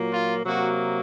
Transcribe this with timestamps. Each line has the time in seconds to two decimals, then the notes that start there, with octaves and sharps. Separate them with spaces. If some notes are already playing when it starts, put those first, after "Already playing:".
Already playing: A#2 F#3 A#3
0.12 F4
0.45 C3 F#3 A#3 F#4